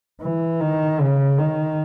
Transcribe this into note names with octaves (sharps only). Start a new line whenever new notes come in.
E3
D#3
C#3
D#3